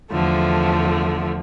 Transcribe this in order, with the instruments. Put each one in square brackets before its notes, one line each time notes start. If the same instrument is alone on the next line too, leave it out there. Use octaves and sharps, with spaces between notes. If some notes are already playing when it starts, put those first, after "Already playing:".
[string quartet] E2 D3 F3 A3